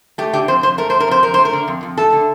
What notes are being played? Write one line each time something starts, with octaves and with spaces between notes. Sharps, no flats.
A3 G4
D3 G4
F2 C5
F2 C5
A3 A#4
D3 C5
A#4
F2 C5
F2 A#4
A3 C5
A#4
D3
F2
F2
A3 A4
D3